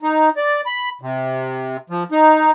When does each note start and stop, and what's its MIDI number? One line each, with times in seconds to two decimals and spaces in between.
0.03 0.29 63
0.37 0.61 74
0.66 0.89 83
1.02 1.77 48
1.90 2.03 53
2.12 2.51 63